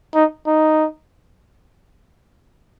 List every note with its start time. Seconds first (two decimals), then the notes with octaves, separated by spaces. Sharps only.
0.15 D#4
0.47 D#4